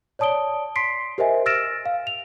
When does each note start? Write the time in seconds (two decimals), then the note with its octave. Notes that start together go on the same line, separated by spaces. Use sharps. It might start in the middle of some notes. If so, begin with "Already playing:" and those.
0.19 C#5 D5 A5 D#6 D7 G7
0.76 C6 B6 C7 D7
1.18 G4 A#4 C5 D#5 E5 G#5
1.46 E6 F6 A6 A#6 D7 E7
1.86 F5
2.07 F7